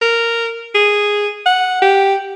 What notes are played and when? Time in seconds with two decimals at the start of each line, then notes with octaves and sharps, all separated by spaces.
0.02 A#4
0.75 G#4
1.46 F#5
1.82 G4